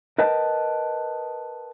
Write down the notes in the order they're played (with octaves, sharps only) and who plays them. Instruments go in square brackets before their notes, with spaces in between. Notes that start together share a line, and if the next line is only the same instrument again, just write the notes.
[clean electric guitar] A#4 B4 D#5 G5 A5